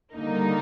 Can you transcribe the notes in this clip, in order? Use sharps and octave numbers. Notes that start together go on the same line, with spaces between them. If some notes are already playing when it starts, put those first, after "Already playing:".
D#2 D3 G3 A#3 D#4